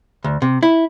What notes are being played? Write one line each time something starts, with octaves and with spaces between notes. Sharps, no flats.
D2
C3
E4